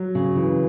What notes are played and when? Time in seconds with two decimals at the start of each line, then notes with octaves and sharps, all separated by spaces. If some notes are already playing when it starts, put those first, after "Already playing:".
Already playing: F#3
0.15 C#3
0.36 E3